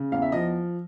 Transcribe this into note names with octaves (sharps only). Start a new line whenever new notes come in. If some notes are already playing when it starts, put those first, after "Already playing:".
Already playing: C#3
E2 F5
E5
F3 D#5